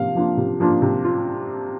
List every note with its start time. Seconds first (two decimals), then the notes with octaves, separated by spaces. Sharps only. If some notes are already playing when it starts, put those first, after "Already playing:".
Already playing: C3 F3 A#3 D4 F4 F5
0.15 F3 A#3 D4 F4
0.37 C3
0.60 F3 A#3 D4 F4
0.82 C3
1.04 F4